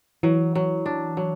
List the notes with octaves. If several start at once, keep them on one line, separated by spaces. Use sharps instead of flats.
E3 F#3
F#3
D4
F#3